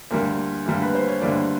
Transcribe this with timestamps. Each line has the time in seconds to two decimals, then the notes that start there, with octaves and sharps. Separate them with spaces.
0.11 D2 D3 G3 A#3 A#4
0.66 D2 D3 G3 A#3 A#4
0.82 B4
0.95 C5
1.08 C#5
1.21 D2 D3 G3 A#3 D5